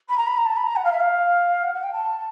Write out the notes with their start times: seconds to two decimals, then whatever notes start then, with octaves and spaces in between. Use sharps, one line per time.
0.08 B5
0.17 A#5
0.26 B5
0.37 A#5
0.45 A5
0.56 B5
0.66 A#5
0.75 F#5
0.84 F5
0.92 E5
1.00 F5
1.63 F#5
1.74 F#5
1.83 G5
1.92 A5